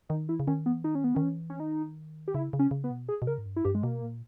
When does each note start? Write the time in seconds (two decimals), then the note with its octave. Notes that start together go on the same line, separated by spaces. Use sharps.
0.09 D#3 D#4
0.29 E3 E4
0.40 C#3
0.47 D#3 C#4
0.66 E3 B3
0.84 D#3 D#4
0.95 C#4
1.04 B3
1.15 D#3 C#4
1.22 E3
1.50 C#4
1.59 D#3 D#4
2.28 G4
2.34 C#3 E4
2.53 C#3
2.59 C#4
2.71 C#3
2.84 B3
2.90 B2
3.09 G#4
3.22 B2
3.27 C#3 A#4
3.38 G#2
3.46 G2
3.56 E4
3.65 G2 G4
3.75 G#3
3.83 B2 A#3
4.03 A#2